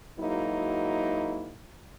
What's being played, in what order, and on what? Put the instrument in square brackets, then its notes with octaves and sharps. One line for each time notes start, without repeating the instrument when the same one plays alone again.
[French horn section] G#2 F#3 A#3 D#4 E4 F#4